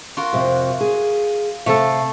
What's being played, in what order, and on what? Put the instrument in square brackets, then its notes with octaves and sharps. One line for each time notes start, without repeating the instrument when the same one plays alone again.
[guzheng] F4 F#4 A#4
[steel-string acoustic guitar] F2 C3
G#4
[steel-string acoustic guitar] C3 F5 [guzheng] A3 A4